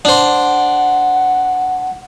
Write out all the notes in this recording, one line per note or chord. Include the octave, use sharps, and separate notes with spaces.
D4 C5 F#5